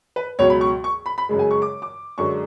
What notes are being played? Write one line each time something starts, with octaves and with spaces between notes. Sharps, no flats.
B4
C#2 B2 F#3 C#5
B5
C#6
C#6
B5
B5
F#2 C#3 G#3
G#5
C#6
D6
D6
F#2 D3 G#3 C#6